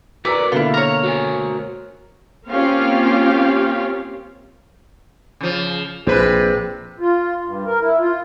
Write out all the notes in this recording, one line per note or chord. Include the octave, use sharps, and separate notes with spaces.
F#4 A#4 B4 D5 A#5 E6 B6
B2 D3 A#3 E4 F4
A#4 C#5 A#5
F#4 C5 G#5
A#3 C4 C#4 F4 G4 F5
C#3 F3
A#1 C3 G#4 B4 C5
F4
G2
A#4
E4
F4